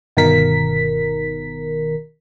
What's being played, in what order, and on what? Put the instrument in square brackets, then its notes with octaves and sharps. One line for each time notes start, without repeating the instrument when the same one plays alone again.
[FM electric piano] G1 B2 D#3 A#4 B6